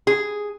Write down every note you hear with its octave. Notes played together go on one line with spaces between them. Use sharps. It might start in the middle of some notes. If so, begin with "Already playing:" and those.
G#4